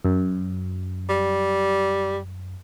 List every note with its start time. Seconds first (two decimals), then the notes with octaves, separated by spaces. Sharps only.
0.05 F#2
1.09 G3